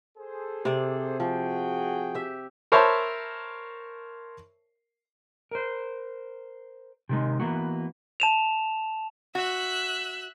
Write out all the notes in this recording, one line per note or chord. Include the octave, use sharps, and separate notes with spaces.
G#4 A4 C5
C3 D5
F3 F#4 G#4 G5
G4 E5
A#4 C5 C#5 E5 A5 B5
A#4 C5
C3 D#3 G#3
E3 A#3 B3 F#4
A5 E7 F7
F#4 E5 F#6